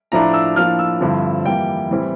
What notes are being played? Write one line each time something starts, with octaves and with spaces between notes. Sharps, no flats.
A2 F3 A3 D4 A#5
E6
A2 F3 A#3 D4 F6
E6
G2 D3 F3 C4 E4
F2 E3 G3 A#3 E4 G5
A2 E3 G3 C4 E4